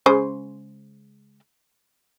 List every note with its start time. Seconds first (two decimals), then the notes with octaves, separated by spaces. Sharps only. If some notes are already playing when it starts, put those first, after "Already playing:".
0.06 C#3 G#3 C5